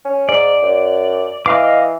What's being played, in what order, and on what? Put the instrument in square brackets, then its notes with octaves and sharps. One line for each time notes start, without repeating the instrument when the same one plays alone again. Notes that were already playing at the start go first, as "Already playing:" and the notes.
[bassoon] C#4
[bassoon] G#2 [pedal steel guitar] D5
[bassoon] F#2
[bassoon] E3 [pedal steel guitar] D#5 F5 D6